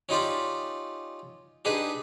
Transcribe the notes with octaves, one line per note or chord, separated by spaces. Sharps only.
C#4 D#4 F4 G4 D5
D4 D#4 G4 G#4 B4